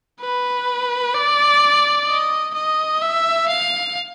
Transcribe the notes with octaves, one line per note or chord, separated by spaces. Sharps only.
B4
D5
D#5
D#5
E5
F5